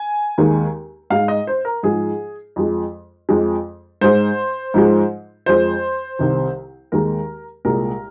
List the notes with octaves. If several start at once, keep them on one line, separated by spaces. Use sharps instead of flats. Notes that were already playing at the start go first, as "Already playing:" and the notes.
Already playing: G#5
D#2 D#3 G#3
G#2 G#3 F5
D#5
C5
A#4
G#2 F3 G#3 G#4
F2 F3 G#3
F2 F3 G#3
G#2 G#3 C5
G#2 F3 G#3
F2 F3 G#3 C5
C2 C3 D#3
D#2 D#3 G#3 A#4
C2 A#2 G#3 A#4